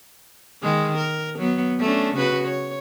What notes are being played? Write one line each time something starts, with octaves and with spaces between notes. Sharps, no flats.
D#3 G#3
A#4
F#3 B3
A3 C#4 D4
C#3 F#4 B4
C#5